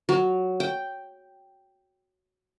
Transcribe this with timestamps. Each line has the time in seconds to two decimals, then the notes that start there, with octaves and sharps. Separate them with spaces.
0.09 F#3
0.60 G5